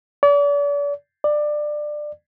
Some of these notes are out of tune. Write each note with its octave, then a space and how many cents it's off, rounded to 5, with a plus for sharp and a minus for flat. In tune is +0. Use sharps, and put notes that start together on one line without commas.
D5 -40
D5 +20